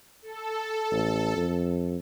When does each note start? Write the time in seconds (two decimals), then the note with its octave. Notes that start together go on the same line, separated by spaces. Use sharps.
0.22 A4
0.92 A1
1.37 F2